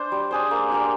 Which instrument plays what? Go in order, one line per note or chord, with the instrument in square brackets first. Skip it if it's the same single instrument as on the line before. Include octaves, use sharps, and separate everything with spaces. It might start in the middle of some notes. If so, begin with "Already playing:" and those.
Already playing: [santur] D4 C5
G3
D4 G#4 C5
A#3
D4 G4 A#4